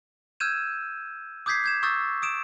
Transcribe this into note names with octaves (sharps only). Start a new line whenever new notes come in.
E6 F6 G6 G#6 D#7 E7
D6 D#6 G6 G#6 B6 C7
G6 G#6 E7
C#6 D#6 E6 G6 A6
D#6 D7 E7